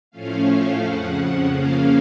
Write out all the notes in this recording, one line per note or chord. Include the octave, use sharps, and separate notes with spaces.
A2 F3 A3 C#4 F5
F2 C#3 F3 F#5
C#3 F3 A#3 C#4 F5